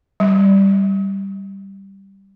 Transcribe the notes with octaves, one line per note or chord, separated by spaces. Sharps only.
G3